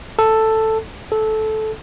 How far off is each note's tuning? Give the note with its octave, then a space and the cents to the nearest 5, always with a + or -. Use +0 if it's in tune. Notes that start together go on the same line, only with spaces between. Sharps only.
A4 +5
A4 -15